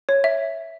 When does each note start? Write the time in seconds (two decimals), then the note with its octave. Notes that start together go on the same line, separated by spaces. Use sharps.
0.09 C#5
0.24 E5